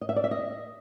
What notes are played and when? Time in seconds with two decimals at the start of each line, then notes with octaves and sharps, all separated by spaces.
0.01 D#5
0.09 E5
0.16 D5
0.24 E5
0.31 D#5